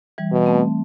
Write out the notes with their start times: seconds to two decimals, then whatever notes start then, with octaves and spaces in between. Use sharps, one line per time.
0.18 E3 G3
0.32 B2
0.46 A3 C4